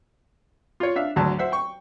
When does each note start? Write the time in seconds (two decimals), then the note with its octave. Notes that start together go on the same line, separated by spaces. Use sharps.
0.80 F4 C#5
0.96 D4 E5 F5
1.16 G#1 D2 F#3 A5
1.39 C5 E5 F#5
1.52 G5 C#6